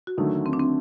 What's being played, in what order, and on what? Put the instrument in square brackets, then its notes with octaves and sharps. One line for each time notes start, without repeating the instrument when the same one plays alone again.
[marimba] F#4
[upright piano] D#2 D3 F#3 A3 [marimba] D#4
[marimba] C4
D4
C4